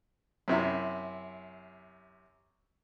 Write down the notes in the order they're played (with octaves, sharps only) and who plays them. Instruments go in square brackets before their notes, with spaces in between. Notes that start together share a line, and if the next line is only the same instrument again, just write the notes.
[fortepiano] F#2 C3 E4